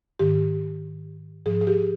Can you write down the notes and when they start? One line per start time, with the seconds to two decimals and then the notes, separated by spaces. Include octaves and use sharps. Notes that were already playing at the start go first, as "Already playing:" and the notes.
0.19 G#2 D#3 G4
1.46 G#2 F3 G#4
1.61 G#4
1.67 G4